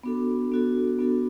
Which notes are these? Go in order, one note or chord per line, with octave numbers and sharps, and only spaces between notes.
B3 D4 F#4 A4
B3 D4 F#4 A4
B3 D4 F#4 A4